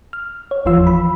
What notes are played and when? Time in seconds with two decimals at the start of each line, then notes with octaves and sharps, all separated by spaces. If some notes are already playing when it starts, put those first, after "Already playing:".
0.13 F6
0.51 C#5
0.65 G1 E2 E3 F3 F4 E6
0.87 B5